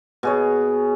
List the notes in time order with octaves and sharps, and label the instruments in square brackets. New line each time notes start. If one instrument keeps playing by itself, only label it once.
[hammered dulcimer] B2 G#4 C#5